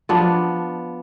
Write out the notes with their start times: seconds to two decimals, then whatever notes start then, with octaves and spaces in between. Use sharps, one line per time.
0.09 F3 B3 D4